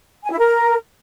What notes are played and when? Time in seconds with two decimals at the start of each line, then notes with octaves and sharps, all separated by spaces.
0.23 G#5
0.31 E4
0.39 A#4